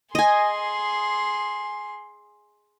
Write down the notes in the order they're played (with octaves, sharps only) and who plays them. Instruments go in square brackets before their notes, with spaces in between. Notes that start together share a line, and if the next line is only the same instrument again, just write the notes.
[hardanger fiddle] G#4 C6 [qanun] D#5 G#5